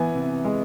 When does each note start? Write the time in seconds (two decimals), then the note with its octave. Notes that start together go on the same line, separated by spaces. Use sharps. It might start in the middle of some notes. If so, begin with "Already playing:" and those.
Already playing: E3 B3 G#5
0.15 C3
0.45 G#3